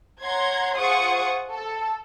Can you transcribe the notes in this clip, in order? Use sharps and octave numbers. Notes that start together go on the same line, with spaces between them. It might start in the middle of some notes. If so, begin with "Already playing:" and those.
C#5 F#5 A#5 C6 G#6
F4 G#4 C5 F#5 C#6 D#6
A4